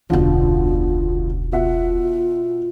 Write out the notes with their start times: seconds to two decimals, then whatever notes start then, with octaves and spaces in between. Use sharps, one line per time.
0.10 E1 C#2 B2 D3 F3 F4
1.52 B2 F4 E5 F#5